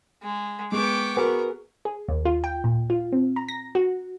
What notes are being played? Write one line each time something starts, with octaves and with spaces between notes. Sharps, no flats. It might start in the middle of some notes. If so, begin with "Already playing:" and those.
G#3
G#3 B3 G5 C#6 D6
F#4 G#4 A#4 B4
G#4
D#2
F4
G5
A#2
F4
C4
A#5
A#6
F#4